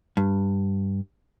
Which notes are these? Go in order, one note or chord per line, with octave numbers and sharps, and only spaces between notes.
G2